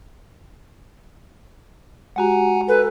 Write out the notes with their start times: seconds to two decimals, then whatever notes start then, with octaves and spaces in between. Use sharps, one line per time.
2.16 G#3 F#4 G4 F#5 G#5 A#5
2.68 A4 B4 G#5